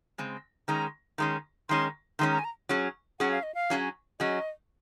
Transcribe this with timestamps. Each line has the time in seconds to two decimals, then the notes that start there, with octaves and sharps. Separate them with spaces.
0.18 C#3 G#3 C4
0.68 D#3 G#3 C#4 A#5
1.18 D#3 G#3 C#4 C6
1.69 D#3 G#3 C#4 C6
2.19 D#3 G#3 C#4 C6
2.32 A#5
2.39 G#5
2.44 A#5
2.69 F#3 C#4 G#4
3.19 F#3 C#4 G#4 F#5
3.31 F5
3.43 D#5
3.55 F5
3.70 F#3 C#4 G#4
4.20 F#3 C#4 G#4 D#5